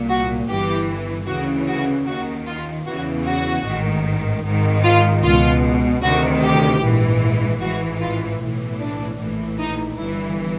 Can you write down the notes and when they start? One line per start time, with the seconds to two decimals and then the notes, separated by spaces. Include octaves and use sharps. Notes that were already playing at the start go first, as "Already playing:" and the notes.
Already playing: C2 A#2
0.10 F#4
0.49 G1 G2 E3 G4
1.28 D2 C#3 E3 F#4
1.68 F#4
2.07 D#2 D#3 F#4
2.47 F4
2.86 E2 C#3 E3 F#4
3.26 F#4
3.65 A1 G#2 D#3
4.45 G#1 G#2 D#3
4.84 F4
5.24 C#2 B2 F4
6.02 D2 C3 D#3 F#4
6.42 G4
6.82 A#1 G#2 E3
7.61 A1 G#2 E3 F#4
8.01 F4
8.40 B1 A2 E3
8.80 D4
9.19 A#1 A2 E3
9.59 D#4
9.98 G1 G2 E3 E4